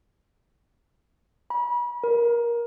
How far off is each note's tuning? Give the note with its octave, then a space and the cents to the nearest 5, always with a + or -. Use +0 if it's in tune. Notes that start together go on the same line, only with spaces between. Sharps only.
B5 -35
A#4 +20